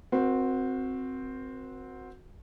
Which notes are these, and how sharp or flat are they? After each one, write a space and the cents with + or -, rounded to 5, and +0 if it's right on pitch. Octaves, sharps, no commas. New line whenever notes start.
C4 +0 F#4 -15 A#4 +30